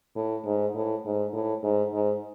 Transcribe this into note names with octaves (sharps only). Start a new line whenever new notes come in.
A2
G#2
A2
G#2
A2
G#2
G#2